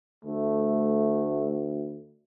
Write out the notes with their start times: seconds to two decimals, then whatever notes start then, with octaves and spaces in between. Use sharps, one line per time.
0.25 D2 A3